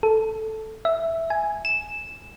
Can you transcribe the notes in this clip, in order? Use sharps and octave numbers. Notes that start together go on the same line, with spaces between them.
A4
E5
G#5
E7